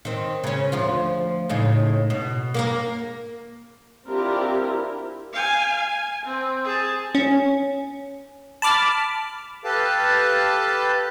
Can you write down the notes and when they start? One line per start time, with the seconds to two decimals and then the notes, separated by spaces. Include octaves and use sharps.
0.05 D#3 C4
0.44 C#3 C#4
0.72 D2 F3 F4
1.49 A2 C#3 D#4
2.10 B2
2.54 A#3 G4 A#4
4.09 C4 D4 E4 F4 G4 A#4
5.33 F5 G#5
5.76 G#5
6.26 C4
6.64 G#4 A5
7.15 C#4
8.62 A5 B5 D6 F6
9.64 G4 A4 B4 F5 A5